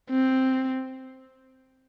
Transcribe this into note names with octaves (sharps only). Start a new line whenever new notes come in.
C4